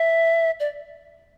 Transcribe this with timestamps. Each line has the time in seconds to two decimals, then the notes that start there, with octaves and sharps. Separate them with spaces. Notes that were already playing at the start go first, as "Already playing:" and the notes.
Already playing: E5
0.60 D5